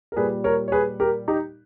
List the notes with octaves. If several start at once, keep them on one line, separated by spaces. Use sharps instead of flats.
A#4
A#2 G3 G#4 B4
A#4 C#5
C#5
G#4 B4
G4 A#4
D#4 G4